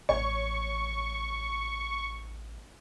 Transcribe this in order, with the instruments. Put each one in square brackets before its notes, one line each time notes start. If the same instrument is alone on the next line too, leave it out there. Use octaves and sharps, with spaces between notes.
[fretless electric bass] A1 [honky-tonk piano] C#5 [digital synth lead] C#6